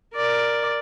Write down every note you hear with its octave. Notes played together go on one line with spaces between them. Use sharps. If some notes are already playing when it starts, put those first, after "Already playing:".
A#4 D5